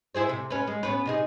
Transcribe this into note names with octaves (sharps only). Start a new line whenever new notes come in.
E4 G#4 C5
C3
C#4 B4
G#3
B3 C#4 B4
C3 D#4 G#4